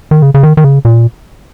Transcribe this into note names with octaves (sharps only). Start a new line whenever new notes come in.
D#3
C#3
C#3
D#3
D#3
C#3
A#2